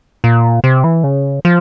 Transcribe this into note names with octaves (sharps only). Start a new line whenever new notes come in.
A#2
C3
E3
C#3
F3